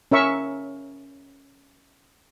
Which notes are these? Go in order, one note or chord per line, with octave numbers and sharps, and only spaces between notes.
C#4 A#4 E5 C#6